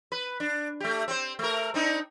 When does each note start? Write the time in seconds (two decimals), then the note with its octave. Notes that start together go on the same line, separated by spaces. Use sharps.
0.12 B4
0.40 D4
0.80 A3 G4
1.08 C4 C5
1.39 A3 A#4
1.74 C4 D4 D#4